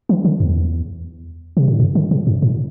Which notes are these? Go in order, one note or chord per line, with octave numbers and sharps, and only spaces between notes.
E3
D3
E2
C3
A2
G2
D3
C3
G2
A2